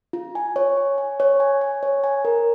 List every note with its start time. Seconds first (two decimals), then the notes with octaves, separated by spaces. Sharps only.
0.13 F4
0.35 G#5
0.56 C#5
0.77 G#5
0.98 G#5
1.20 C#5
1.40 G#5
1.61 G#5
1.83 C#5
2.04 G#5
2.25 A#4